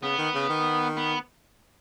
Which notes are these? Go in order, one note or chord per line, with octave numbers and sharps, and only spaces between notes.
C#3 B3
D#3
C#3
D#3
B3